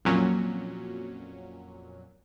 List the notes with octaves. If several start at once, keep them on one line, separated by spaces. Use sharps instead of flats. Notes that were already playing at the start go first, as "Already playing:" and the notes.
F2 A#2 F#3 C#4